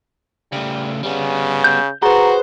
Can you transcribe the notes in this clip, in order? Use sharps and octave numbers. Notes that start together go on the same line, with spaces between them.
C#3 G3 A3
C#3 G3 B3
G6
F#4 G#4 B4 C5 A#5